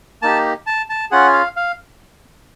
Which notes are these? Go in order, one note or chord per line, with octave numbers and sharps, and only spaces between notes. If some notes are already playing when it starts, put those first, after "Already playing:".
A#3 D#4 G4 A5
A5
A5
C#4 F4 G#4 F#5
F5
F5